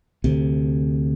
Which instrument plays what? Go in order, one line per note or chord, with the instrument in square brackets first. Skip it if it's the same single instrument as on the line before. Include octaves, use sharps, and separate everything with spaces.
[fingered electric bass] D2 C3